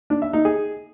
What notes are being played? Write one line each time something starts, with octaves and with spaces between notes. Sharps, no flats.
D4
E5
D#4
G#4